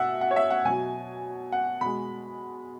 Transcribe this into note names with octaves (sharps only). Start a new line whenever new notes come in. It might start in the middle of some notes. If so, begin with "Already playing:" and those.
Already playing: B2 E5 F#5
F#5
C#5
E5
F#5
B2 F#3 G#5
F#5
B2 G#3 B5